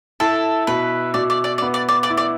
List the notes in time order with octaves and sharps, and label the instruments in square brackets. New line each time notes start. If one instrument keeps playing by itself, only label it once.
[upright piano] E4 [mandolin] A4
[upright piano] B2 [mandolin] B4
[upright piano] B2 [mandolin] D5
[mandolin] D5
D5
D5
[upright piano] B3
[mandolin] D5
D5
D5
[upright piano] E4
[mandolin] D5